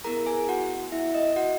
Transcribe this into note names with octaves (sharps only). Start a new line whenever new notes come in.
B3 E4 G#4 A#4 A#5
G#4 G#5
F#4 F#5
E4 E5
D#5
F#4 F#5